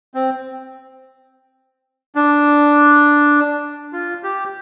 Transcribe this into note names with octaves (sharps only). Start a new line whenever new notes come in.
C4
D4
F4
G4